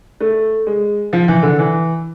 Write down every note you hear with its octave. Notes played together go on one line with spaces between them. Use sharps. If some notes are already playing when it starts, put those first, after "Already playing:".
A3
G#3
F3
E3
D3
E3